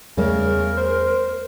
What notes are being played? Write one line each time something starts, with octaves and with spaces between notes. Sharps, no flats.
E2 C#3 G3 A3 A#4
C5